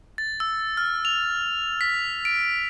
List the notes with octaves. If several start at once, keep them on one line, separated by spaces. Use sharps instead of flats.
A6
E6
F6
F7
B6
D7